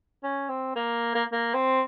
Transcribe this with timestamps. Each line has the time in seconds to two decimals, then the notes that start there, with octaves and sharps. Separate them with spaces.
0.23 C#4
0.49 C4
0.76 A#3
1.15 A#3
1.32 A#3
1.54 C4